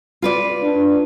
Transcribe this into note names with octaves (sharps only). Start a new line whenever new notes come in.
F4 B4 D5
D4